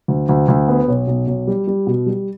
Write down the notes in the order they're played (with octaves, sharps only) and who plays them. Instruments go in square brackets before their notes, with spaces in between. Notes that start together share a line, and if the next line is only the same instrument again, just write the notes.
[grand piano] D2
D2
D2
B3
B1
B1
B1
G3
G3
B2
G3